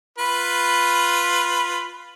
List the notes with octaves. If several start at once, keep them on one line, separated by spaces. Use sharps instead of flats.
F4 B4 B5